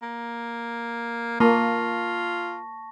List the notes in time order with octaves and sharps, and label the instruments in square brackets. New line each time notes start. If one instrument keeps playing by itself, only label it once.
[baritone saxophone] A#3
[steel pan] A#3 [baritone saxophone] F4 [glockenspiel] A5 C#6 A#6